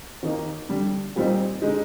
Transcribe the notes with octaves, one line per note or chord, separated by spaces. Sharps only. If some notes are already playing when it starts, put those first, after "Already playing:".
D#2 D#3 A#3 D#4
D3 G3 D4
A#2 G3 C4 D#4
D3 G#3 D#4